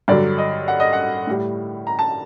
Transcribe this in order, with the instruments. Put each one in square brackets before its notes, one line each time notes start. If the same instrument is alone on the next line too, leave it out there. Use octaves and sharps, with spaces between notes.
[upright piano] G2 D3 F#3 D5
D#5
F#5
D#5
F#5
A2 G3
A#5
A5